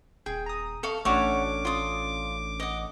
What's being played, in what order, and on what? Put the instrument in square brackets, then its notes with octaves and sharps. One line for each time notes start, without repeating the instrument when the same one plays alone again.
[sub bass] D#1 [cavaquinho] G#4 [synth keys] G5
[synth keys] A#5 D#6
[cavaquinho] A4 F5 C#6
[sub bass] A1 [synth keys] A3 C#4 D4 [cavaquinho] F#4 C#5 [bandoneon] D6
[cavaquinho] F4 D#6
D#5 F#5